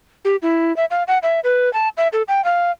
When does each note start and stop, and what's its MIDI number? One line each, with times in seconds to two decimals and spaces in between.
0.25 0.36 67
0.42 0.75 64
0.77 0.85 76
0.91 1.03 77
1.08 1.18 78
1.23 1.40 76
1.44 1.72 71
1.73 1.89 81
1.97 2.08 76
2.13 2.22 69
2.28 2.44 79
2.44 2.71 77